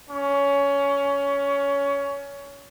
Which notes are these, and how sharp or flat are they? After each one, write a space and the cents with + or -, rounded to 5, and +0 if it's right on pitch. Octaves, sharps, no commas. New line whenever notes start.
C#4 +20